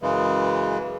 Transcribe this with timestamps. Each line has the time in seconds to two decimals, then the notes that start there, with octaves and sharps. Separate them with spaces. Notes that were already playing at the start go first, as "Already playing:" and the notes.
0.02 F#2 C#3 E3 G#3